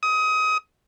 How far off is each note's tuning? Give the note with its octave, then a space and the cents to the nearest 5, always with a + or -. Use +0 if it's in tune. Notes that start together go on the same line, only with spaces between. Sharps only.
D#6 +25